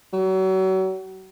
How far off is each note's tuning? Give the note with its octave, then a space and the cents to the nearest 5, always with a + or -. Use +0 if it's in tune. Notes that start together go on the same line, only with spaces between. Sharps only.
F#3 +35